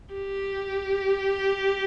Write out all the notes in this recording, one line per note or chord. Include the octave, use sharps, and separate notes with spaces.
G4